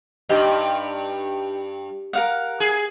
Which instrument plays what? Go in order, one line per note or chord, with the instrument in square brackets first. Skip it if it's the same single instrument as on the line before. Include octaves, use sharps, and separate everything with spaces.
[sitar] G2 [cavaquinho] D#4 G4 C6
[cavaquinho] A#4 F5 F#5
[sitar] G#4